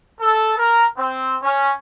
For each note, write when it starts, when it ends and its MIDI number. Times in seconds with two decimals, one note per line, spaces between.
0.20 0.52 69
0.58 0.85 70
0.97 1.37 60
1.42 1.72 61